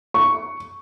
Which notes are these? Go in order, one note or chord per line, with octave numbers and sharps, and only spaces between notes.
C#6